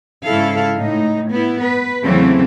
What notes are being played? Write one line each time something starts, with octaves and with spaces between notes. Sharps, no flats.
G#2 C#3 E4 A4 F5
A2 D#4
B3 E4
B4
E2 C#3 E3 F#3 A3 C4